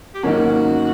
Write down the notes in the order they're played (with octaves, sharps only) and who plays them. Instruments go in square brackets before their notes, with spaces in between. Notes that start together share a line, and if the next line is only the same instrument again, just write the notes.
[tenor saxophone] G4
[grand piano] G#2 D#3 F#3 A#3 C#4 [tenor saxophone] F#4